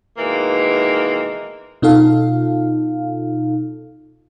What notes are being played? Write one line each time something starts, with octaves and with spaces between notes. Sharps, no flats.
B2 D#3 E3 G#3 A#3
B2 D#4 F4 A4 F5